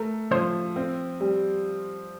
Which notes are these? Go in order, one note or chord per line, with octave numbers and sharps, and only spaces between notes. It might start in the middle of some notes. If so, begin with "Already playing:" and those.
Already playing: A3 A#4
F3 C5
C4
G3